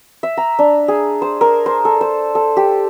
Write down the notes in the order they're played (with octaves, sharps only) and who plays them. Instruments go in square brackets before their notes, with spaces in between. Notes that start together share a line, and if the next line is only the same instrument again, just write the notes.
[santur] E5
A#5
D4
G#4
C5
A#4
C5
A4
C5
A4
G4